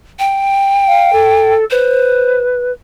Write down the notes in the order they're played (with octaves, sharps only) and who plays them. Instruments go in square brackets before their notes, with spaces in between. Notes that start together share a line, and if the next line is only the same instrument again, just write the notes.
[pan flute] G5
[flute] F5
A4
[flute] B4 [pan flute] C5